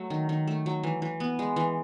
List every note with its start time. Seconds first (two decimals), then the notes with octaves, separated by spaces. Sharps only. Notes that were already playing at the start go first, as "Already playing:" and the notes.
Already playing: F#3 A3
0.10 D#3
0.29 D#3
0.47 A3
0.66 F#3
0.83 E3
1.02 E3
1.20 B3
1.39 G#3
1.56 E3